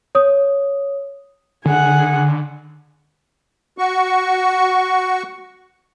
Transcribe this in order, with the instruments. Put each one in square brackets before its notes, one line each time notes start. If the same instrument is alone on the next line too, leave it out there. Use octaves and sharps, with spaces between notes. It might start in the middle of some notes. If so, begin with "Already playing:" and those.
[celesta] C#5 D#6
[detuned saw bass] D3 [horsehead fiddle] G#4 F#5
[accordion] F#4 C#6